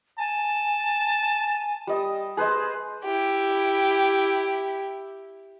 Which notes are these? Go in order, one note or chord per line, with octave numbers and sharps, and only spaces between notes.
G#5 A5
G3 D#5 D#6
G#4 B4 C5 D#5
E4 G4